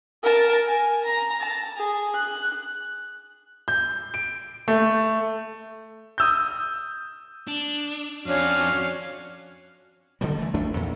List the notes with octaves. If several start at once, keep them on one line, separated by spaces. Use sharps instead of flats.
A#4 A5
G#5
A#5
A5
G#4
F#6
G6
D7
A3
D#6 E6 G6
D4
F2 C#4 D4 F#4 C#5 F5
D3 D#3 F3 G3
E3 A3
A1 F2 A3 D4
E2 A#2